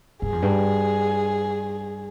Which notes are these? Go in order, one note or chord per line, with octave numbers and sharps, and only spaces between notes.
G2 G#4
F2
G2